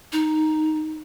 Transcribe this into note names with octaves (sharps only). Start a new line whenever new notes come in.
D#4